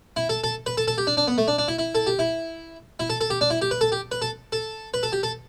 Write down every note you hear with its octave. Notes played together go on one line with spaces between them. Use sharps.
E4
A4
A4
B4
A4
A4
G4
D4
D4
B3
A3
D4
D4
E4
E4
A4
G4
E4
E4
A4
A4
G4
D4
E4
G4
B4
A4
G4
B4
A4
A4
B4
A4
G4
A4